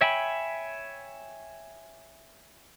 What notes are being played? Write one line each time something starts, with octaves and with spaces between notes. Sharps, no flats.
C#5 E5 G5 G#5 B5